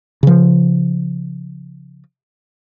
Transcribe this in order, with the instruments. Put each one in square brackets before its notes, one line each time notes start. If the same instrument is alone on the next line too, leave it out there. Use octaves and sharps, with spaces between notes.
[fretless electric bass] C#3 F3